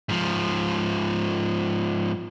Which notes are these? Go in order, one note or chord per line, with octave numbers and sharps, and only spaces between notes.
G#2 F3